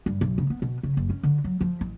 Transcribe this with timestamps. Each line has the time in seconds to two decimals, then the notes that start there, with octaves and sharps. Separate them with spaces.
0.06 G2
0.21 B1
0.38 C#3
0.50 B3
0.62 B2
0.83 C#3
0.97 F#1
1.10 C#4
1.23 D3
1.44 F#3
1.61 F3
1.81 A1